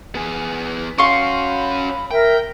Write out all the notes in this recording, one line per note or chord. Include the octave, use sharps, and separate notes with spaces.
B3 G#4
C#4 F#4 F5 C6 C#6
B5
A#4 E5 G5